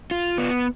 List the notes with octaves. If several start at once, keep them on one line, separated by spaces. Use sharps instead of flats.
F4
B3